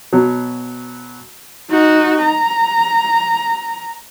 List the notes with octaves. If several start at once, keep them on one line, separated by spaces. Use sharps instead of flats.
B2 F#3
D#4 F#4
A#5